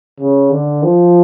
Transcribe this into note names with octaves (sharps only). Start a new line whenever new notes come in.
C#3
D3
F3